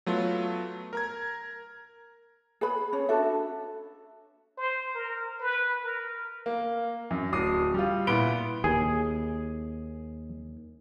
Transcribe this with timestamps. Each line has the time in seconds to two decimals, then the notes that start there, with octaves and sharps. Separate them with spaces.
0.06 F#3 A3 B3 F4
0.93 A#4 A#5 G#6
2.61 G#4 B4 B5
2.93 C#4 C#5
3.09 D4 F#4 A4 E5
4.57 C5
4.94 A#4
5.40 B4
5.84 A#4
6.46 A#3
7.10 F#2
7.33 D1 D#6 C7
7.74 G3 F4
8.07 A#2 B3 E4 B5 D7 G7
8.64 D#2 G#4